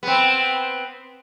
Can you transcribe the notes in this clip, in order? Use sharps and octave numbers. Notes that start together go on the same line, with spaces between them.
B3 C4